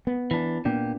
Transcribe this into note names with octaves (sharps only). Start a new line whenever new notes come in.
B3
E3 D4
A#2 A#3 B3 D4 G4